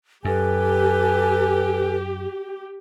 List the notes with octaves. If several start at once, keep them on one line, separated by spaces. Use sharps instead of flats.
F#2 G4 A4 B4 G#5